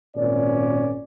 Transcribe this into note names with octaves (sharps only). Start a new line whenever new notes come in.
G#1 A#2 C#4 D5